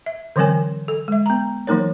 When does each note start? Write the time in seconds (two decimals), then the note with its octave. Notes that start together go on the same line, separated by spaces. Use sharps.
0.06 E5
0.36 D3 E3 F#3 C4 A#4 G#5
0.88 A4
1.08 G#3 E5
1.26 B3 A#5
1.67 E3 F#3 A#3 D#4 A#4 C#5